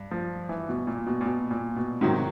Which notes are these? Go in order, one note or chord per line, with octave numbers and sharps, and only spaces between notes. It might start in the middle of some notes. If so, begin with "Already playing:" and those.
Already playing: G2
F3
E3
B2
A#2
B2
A#2
B2
A#2
B2
G#2 C3 D#3 F#3